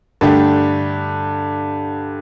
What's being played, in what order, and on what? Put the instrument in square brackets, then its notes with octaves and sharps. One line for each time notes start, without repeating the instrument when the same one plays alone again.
[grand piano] G2 D3 A3 D4 G4